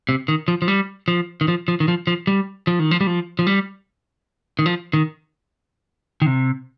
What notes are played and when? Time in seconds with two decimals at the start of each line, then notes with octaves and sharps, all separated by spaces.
0.09 C3
0.28 D#3
0.48 F3
0.62 F3
0.68 G3
1.08 F3
1.41 D#3
1.48 F3
1.68 F3
1.80 D#3
1.88 F3
2.07 F3
2.27 G3
2.67 F3
2.79 D#3
2.91 F3
3.01 G3
3.07 F3
3.39 F3
3.47 G3
4.59 D#3
4.66 F3
4.93 D#3
6.22 D#3
6.26 C3